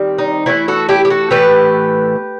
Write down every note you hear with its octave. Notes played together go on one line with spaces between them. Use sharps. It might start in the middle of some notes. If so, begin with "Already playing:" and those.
Already playing: D#3 G3 C4
D#4
E3 A3 C4 E4
F#4 A4
E4 G4
G4
F#4 A4
A2 E3 A3 G4 B4